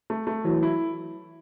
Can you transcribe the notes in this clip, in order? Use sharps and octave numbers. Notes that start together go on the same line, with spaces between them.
A3
A3
E3 F#3
E4